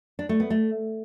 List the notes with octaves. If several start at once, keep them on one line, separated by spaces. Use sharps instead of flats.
D4
A3
B3
A3